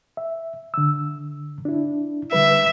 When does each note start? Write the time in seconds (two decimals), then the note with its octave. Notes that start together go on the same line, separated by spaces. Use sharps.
0.17 E5
0.74 D3 E6
1.65 D4 E4
2.33 D3 G3 B4 E5